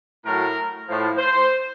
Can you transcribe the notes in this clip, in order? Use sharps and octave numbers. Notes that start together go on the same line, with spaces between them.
A2 F#3 A#4
A2 F3
C5